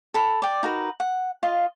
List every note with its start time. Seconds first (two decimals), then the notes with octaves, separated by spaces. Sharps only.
0.14 A4 B5
0.42 D5 G5
0.63 D#4 F#4 A#4 B4
1.00 F#5
1.43 F4 D#5 F5